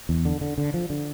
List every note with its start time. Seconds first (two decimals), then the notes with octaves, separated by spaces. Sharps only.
0.09 E2
0.25 D3
0.41 D3
0.58 D3
0.74 F3
0.90 D3